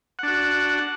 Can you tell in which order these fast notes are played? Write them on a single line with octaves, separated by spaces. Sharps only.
F#5 D4 F#4